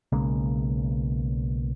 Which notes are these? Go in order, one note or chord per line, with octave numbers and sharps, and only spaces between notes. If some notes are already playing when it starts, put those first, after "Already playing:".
B1 C#3 G#3 A#3